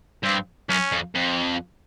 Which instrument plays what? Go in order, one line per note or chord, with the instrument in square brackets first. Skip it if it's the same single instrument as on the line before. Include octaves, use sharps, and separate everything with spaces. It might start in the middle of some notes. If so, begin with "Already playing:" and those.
[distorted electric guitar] G2 [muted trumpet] C4
[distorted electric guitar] F#2 [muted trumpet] C#4
[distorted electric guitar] F2
F2